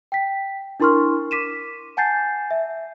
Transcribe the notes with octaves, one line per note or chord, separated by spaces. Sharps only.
G5 B6
D4 E4 A#4 C6 C#6 F6
D6 B6 D#7 E7
F#5 G#5 A5 G6 A6 C7
E5